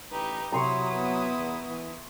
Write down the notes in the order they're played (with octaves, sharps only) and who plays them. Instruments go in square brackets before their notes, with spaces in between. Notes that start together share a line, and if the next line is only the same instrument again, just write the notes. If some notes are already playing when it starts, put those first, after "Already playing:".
[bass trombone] A1 [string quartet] D#4 G4 B4
[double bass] C3 [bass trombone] F#3 [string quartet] E4 D#6 [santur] A#5 C6 C#6
[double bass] B3
[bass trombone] E2
E3